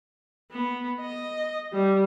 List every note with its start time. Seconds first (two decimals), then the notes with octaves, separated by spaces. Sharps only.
0.51 B3
1.00 D#5
1.73 G3